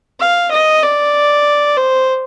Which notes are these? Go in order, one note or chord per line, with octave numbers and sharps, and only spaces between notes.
F5
D#5
D5
C5